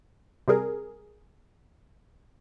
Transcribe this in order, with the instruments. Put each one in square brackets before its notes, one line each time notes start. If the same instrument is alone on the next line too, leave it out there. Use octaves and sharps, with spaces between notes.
[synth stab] C3 G3 G#4 A#4